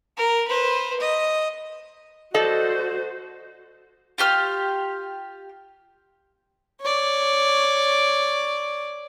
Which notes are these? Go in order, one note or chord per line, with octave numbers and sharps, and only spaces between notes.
A#4
B4 C5
D#5
F#4 A4 C5 D5 D#5
F4 G4 F6
C#5 D5